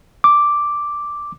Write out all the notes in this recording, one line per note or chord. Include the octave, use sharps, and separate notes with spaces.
D6